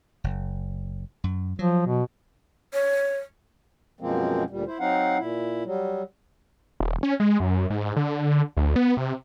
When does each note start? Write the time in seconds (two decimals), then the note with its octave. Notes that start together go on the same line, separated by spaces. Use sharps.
0.24 F#1
1.24 F#2
1.59 F3 F#3
1.87 B2
2.74 C#5
4.01 F#2 B2 F3 G#3 A#3 C4
4.50 D2 A#2 G3
4.67 E4 C5
4.80 F#3 C4 D#4 F5 F#5
5.18 A#2 E4
5.65 F#3 G3
6.80 D#1
7.03 C#4
7.20 G#3
7.40 F#2
7.70 G#2
7.96 D3
8.57 D2
8.76 B3
8.97 C3